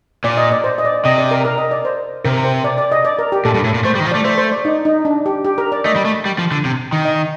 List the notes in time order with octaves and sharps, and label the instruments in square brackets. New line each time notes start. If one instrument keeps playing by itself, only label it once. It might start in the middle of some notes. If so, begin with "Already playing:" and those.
[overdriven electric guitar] A#2 [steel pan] D5
[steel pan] D#5
D5
C5
D#5
D5
[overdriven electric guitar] C3 [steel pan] D#5
[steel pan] D5
A#4
A#4
D#5
D5
C5
[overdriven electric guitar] C3 [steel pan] A#4
[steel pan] C5
D5
D5
D#5
D5
A#4
G4
[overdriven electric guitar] A#2 [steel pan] A4
[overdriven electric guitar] G2
A2
A#2
[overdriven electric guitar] A3 [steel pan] C5
[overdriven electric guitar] G3
D#3
F3
[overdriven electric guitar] A3 [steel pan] D5
[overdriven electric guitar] A3 [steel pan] C5
[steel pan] C5
D5
D#4
D#4
D4
G4
G4
A#4
D5
[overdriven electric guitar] A3 [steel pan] D#5
[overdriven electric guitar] G3
A3
G3
F3
D3
C3
D#3
[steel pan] D#5